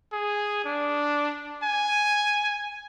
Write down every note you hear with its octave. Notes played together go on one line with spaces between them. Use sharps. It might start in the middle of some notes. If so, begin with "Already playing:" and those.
G#4
D4
G#5